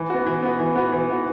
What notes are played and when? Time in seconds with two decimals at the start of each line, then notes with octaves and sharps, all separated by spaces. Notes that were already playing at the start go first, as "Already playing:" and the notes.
Already playing: E3
0.10 B3 F#4
0.26 E3
0.42 B3 F#4
0.59 E3
0.75 B3 F#4
0.92 E3
1.09 B3 F#4